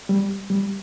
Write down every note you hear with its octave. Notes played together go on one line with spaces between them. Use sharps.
G3
G3